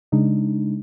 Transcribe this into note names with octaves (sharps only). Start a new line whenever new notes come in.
C#3 G#3 D4 D#4